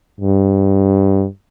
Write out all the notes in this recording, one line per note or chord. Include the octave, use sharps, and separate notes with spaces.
G2